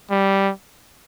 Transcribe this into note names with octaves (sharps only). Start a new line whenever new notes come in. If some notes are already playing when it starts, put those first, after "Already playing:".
G3